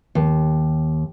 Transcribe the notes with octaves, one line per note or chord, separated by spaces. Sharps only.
D#2